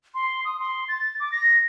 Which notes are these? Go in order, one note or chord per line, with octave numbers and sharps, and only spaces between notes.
C6
D#6
C6
A6
D6
A#6